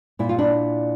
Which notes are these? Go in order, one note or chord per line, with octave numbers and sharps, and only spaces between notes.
A#2 E4
F4
D4 E4